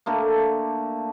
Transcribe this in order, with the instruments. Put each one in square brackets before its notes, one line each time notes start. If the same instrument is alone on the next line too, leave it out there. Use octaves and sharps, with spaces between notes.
[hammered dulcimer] D3 A3 A#3